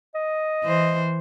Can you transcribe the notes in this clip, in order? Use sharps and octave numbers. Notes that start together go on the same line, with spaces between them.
D#5
E3 C5